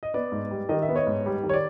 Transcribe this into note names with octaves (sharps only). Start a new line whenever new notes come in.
D#5
B3 D5
G#2
G3
D#3 D#5
E5
B3
C#5 D#5
G#2
G3
D#3
C#5
D5